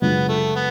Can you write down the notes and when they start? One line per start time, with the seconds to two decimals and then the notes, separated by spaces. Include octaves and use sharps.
0.02 F#2 C#3 G#3 B3 D4 F4
0.28 A3
0.55 B3